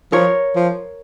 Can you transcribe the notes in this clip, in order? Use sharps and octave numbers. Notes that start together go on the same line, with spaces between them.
F3 A#4 C#5
F3